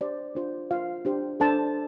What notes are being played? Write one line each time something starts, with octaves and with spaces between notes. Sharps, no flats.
D4 G4 C5 D5
D4 F4 C5
F4 C5 F5
D4 G4 C5
D4 A4 C5 A5